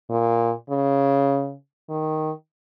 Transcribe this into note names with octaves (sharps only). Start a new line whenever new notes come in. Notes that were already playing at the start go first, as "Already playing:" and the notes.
A#2
C#3
D#3